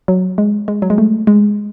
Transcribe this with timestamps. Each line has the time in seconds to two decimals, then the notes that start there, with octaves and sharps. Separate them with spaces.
0.08 F#3
0.38 G#3
0.68 G#3
0.82 F#3
0.90 G#3
0.98 A3
1.27 G#3